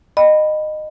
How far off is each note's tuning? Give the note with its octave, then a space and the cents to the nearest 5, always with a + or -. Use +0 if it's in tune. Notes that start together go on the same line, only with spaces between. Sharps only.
D#5 -20 G5 +0 B5 +0